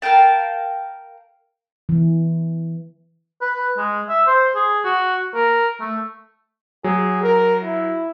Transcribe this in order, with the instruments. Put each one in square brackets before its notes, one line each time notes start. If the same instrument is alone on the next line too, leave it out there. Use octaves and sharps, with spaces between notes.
[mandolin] A#4 F5 G5 A5
[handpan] E3
[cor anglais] B4
G#3
E5
C5
G#4
F#4
A#4
A3
[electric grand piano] F#3 [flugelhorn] G#4
[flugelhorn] A#4
E4